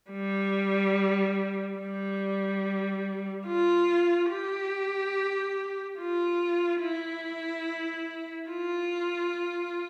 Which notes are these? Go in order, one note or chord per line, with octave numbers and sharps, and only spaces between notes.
G3
G3
F4
G4
F4
E4
F4